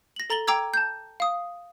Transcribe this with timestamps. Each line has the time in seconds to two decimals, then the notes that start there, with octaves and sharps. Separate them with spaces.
0.16 A#6 F#7
0.30 A4 A#5 A6 F#7 G7
0.47 G5 A#5 D6 E6 G#6
0.74 A5 G6
1.20 F5 D#6